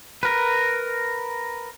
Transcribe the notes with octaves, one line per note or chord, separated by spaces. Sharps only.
A#4 B4